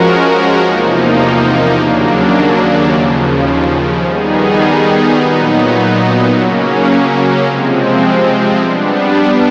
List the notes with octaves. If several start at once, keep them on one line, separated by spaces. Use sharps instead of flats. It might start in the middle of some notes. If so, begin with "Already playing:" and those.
Already playing: F3 G#3 C#4 F#4 A#4
E2 C3 F3 A#3 D#4
D#2 C#3 F#3 A#3 D4
D#2 C#3 F3
D#3 G3 B3 D#4 G#4
A#2 F#3 B3 D#4
C#3 F#3 A#3 C#4
C3 F3 G#3 C4
G3 B3 D4